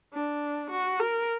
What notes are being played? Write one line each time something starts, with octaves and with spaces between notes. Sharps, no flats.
D4
F#4
A#4